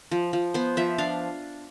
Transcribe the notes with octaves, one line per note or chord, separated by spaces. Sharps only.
F3
F3
B3 C5
F3 E5
D4 F5